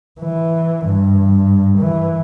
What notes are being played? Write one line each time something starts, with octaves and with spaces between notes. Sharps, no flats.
E3
G2
E3